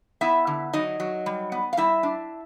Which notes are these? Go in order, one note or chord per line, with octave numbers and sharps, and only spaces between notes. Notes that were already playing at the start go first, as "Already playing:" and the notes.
B3 E4 E5
D3
F#3 D#4 D#5
F#3
G3
B3
F5
G3 E4 E5
D4